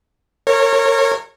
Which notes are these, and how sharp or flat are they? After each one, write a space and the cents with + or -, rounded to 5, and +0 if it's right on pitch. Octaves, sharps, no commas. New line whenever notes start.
A#4 -30 C#5 -20